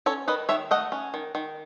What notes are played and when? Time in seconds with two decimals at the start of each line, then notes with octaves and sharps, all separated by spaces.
0.06 C#4 A4 C#5
0.28 D#3 B4 D#5
0.49 D#3 C#5 E5
0.71 A3 D#5 F#5
0.92 C#4
1.14 D#3
1.35 D#3